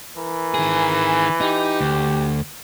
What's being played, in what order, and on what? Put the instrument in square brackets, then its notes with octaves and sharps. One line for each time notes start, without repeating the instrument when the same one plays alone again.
[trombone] E3 [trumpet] A#4
[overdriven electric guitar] D#3 G#4
[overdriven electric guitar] D#4 [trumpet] G4
[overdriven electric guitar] D2